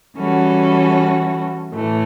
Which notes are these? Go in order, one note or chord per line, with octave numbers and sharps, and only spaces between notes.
E3 G3 C#4 F#4 A4
A2 E3 A3